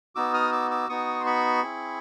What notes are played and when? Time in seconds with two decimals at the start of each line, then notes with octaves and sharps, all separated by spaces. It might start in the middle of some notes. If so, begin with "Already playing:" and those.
0.15 B3 D#4 F#4 D6 E6
0.34 D#6 F6
0.52 D6 E6
0.71 D6 E6
0.89 B3 D#4 F#4 C#6 D#6
1.20 C6
1.26 B5 C#6
1.63 C4 E4 G#4